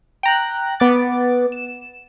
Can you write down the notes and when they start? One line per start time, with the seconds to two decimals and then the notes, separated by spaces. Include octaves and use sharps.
0.23 G5 A#5 F#6
0.80 B3 F#5 D6 A6
1.52 E7